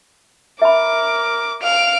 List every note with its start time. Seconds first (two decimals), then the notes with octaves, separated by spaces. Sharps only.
0.62 A#4 E5 B5 D6
1.62 F5 D7 F7